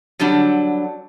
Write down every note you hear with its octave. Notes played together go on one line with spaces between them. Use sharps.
D3 F#3 G3 D4